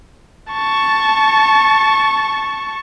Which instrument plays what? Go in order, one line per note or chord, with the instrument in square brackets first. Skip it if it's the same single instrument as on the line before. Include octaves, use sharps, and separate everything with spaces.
[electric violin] A5 C#6